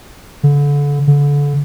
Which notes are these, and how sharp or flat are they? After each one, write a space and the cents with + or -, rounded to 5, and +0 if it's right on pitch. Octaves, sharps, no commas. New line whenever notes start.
D3 -30
D3 -30